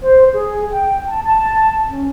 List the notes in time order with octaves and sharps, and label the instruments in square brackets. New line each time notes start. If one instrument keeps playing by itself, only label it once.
[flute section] C5
G#4
G5
A5
A5
C#4